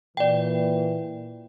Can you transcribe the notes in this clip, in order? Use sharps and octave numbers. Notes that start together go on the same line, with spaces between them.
A#2 E3 D5 G5